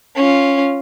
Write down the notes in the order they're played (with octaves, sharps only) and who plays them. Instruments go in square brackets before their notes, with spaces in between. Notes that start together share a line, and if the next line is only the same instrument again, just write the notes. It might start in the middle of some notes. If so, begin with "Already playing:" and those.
[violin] C#4 F4